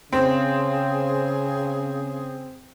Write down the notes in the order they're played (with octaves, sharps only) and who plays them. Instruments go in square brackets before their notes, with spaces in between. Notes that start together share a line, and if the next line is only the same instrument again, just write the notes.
[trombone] C#3 [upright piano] C4 [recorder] G#4